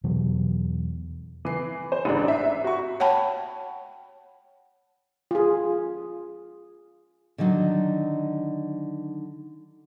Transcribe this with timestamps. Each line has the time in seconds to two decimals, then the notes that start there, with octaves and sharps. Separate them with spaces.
0.04 E2 B2 E3 F#3
1.45 E3 C7
1.92 C5
2.05 A1 G#2 D4
2.28 E5 C7
2.64 F#4 C#6
3.00 C#5 F#5 G5 A5 B5
5.31 F4 G#4
7.38 D3 D#3 F#3 D#4